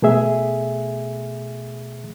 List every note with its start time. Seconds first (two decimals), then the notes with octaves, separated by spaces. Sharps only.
0.02 B2 A3 G#4 E5